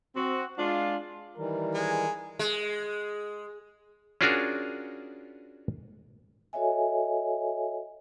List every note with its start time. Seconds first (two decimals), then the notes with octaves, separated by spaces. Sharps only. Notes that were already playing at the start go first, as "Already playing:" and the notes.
0.16 C4 F#4
0.57 G#3 D4 F4
1.37 D#3 E3 G3 A#4
1.75 G#3 G#5
2.39 G#3
4.21 C#4 D4 F4 F#4 G#4 A#4
6.53 F#4 A4 C#5 D#5 E5 G#5